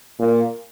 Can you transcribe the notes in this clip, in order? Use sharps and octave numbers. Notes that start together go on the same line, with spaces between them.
A#2